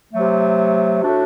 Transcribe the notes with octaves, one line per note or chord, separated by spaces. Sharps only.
C3 F#3 A3
A2 A3 D4 F#4